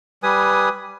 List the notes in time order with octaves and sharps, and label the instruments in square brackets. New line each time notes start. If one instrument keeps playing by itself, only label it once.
[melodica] G3 B4 G#5 D#6